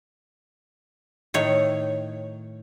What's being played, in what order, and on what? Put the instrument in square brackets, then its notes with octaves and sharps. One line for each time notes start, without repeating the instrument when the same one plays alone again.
[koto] A2 D#3 C#5